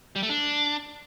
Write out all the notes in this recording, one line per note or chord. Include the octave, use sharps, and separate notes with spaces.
G3
A3
D4